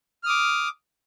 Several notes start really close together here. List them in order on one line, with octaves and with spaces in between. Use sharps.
F6 D#6 D6